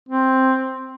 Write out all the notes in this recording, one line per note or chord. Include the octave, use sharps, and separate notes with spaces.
C4